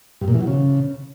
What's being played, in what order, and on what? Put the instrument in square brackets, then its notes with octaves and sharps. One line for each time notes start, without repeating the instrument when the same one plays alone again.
[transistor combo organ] G2
A#2
E3
F#3
C#3